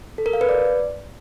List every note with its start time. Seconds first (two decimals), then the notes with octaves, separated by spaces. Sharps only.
0.18 A4
0.26 A#4
0.33 F5
0.41 B4
0.49 D5